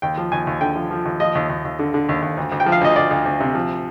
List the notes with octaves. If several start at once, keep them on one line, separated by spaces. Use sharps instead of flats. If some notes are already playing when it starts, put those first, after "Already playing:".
D#2 G5
F3
D#2 G#5
D#2
D3 G5
F3
F3
D#2
F3 D#5
D#2
D#2
D#2
D3
D3
D#2
D#2
D2
D2
G5
F3
F5
D2 D#5
D2 D5
D2
D2
C3
F3